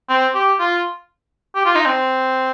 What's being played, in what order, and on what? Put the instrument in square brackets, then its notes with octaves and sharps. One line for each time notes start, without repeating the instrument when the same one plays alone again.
[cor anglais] C4
G4
F4
G4
F4
D#4
C4